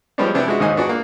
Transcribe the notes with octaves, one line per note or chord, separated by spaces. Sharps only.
F3 G3 G#3 B3 C#4 D4
C3 E3 B3 D4 E4
G#3 E4 F#4
D#2 G#2 D#5 G#5
B3 D4 F#4 G#4
A#3